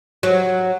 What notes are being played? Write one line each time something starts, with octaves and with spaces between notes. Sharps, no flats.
F#3